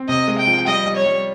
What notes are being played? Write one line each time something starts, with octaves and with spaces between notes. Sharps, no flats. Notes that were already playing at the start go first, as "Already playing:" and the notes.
Already playing: C4
C3 D#5
G#3
G5
F3
G3 D#5
G3
C#5
G3